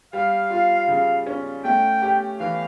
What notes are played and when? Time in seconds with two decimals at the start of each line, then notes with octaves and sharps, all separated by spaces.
0.13 G3 F5
0.50 F4
0.88 C#3
1.27 C#4
1.64 A3 G5
2.02 G4
2.39 E3 F5